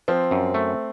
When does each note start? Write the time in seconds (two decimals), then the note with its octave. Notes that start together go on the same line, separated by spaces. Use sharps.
0.08 F3 C4
0.31 F#2
0.54 A3